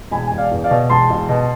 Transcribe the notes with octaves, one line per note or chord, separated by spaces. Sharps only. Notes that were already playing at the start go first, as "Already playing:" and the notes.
E1 G#5 B5
E1 G#5
D5 F5
E2
D5 F5
B2
E1 A5 C6
E1
B2